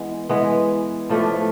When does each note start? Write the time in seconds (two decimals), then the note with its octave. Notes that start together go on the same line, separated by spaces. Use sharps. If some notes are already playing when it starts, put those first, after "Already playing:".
Already playing: E3 G#3 B3
0.29 E3 G#3 B3
1.09 A2 F3 A3 D4